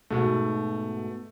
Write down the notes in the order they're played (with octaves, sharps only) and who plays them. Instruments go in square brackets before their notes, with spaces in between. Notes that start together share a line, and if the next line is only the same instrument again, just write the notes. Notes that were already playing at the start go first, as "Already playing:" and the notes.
[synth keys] G#2 B2 [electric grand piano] A3